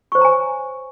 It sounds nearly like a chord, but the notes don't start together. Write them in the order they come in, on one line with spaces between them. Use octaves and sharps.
C#6 C5 C#5 A#5 G#5